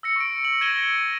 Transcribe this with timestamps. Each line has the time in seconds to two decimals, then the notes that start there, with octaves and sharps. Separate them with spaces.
0.03 E6 A#6 C#7
0.16 C#6 D7
0.45 F#7
0.61 G#6 A#6 D#7 E7 G7